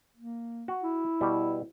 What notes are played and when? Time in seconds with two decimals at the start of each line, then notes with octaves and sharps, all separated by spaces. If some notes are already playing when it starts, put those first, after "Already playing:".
0.17 A#3
0.68 F#4
0.83 E4
1.21 B2 G3